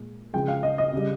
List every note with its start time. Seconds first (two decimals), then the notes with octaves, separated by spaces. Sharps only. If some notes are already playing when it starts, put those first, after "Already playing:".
Already playing: A#2 G#3
0.33 C#3 F3 G#3 G5
0.48 F5
0.63 D#5
0.78 D#5
0.93 C#3 G3